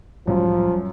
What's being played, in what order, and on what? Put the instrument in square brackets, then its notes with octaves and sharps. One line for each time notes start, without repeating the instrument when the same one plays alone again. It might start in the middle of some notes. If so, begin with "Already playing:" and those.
[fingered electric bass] C2 A2 G3 [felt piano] F#2 [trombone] F3